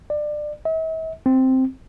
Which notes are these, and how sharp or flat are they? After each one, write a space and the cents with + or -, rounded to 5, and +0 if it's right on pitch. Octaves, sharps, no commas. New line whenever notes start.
D5 +25
E5 -45
C4 +0